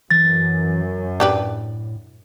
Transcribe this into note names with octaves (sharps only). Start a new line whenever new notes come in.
F#2 E3 A6
A2 D4 G4 B4